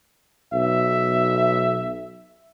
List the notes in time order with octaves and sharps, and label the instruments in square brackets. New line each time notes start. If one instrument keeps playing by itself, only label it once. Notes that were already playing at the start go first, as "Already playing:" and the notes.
[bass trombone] B1 [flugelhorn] E5